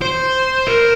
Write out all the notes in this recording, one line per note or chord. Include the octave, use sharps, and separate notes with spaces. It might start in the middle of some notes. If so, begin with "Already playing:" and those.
C5
A#4